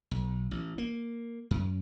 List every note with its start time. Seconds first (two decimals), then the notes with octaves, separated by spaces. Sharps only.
0.11 B1
0.51 A1
0.78 A#3
1.51 F#2